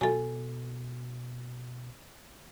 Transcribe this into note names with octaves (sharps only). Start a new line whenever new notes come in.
B2 F#3 F4 A4 G#5